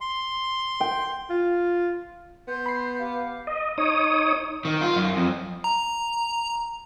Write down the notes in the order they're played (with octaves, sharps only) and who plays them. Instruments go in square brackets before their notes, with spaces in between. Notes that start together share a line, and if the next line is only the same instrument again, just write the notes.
[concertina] C6
[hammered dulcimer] G5
[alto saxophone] F4
[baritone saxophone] B3 [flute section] C6 G6
[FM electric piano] B5 C7
[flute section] G4 F5 D6
[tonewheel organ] D#5
D#4 C#5 D#6
[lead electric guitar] D#3
F4
F#2
F2
[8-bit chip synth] A#5